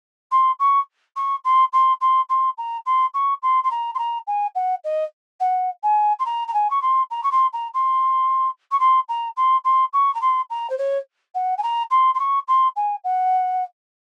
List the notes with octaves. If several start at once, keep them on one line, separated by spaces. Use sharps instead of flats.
C6
C#6
C#6
C6
C6
C6
C6
A#5
C6
C#6
C6
C6
A#5
C6
A#5
G#5
F#5
D#5
F#5
G#5
C6
A#5
A#5
G#5
C#6
C6
A#5
C#6
C6
A#5
C6
C#6
C6
A#5
C6
C6
C#6
A#5
C6
A#5
C5
C#5
F#5
G#5
A#5
C6
C6
C#6
C6
G#5
F#5